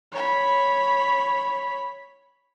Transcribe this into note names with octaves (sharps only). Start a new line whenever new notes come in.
C#5 B5